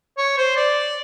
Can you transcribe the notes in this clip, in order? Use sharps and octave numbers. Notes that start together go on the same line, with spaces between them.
C#5
C5
D5